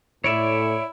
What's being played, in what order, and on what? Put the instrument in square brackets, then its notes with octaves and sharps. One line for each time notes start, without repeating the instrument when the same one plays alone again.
[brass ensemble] A2 [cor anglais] E4 [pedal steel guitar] C#5 D5 E5